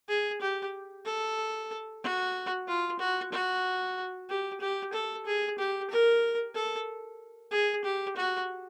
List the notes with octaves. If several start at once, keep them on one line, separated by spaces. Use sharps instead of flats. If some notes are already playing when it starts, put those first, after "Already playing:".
G#4
G4
A4
F#4
F4
F#4
F#4
G4
G4
A4
G#4
G4
A#4
A4
G#4
G4
F#4